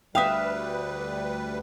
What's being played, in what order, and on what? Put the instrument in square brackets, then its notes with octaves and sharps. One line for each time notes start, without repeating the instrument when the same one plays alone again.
[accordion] D2 G3 B4 [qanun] E5 F5 [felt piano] G5 D#6